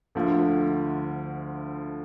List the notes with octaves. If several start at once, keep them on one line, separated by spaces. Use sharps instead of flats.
D2 D3 F3 A3